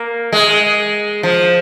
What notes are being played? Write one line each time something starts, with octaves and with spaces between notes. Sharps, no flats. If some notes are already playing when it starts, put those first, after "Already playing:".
Already playing: A#3
G#3
F3